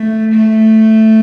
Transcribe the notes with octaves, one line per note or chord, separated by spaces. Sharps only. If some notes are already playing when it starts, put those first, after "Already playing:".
Already playing: A3
A3